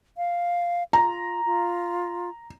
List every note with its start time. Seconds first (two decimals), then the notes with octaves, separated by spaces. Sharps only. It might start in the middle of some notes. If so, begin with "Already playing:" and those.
0.17 F5
0.93 F4 A#5
1.46 F4